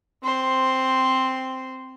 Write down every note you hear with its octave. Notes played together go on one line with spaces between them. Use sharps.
C4 C5